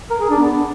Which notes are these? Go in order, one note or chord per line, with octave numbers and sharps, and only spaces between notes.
A#4
G#4
D4
B3